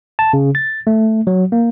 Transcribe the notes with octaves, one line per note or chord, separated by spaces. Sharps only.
A5
C#3
A6
A3
F#3
A#3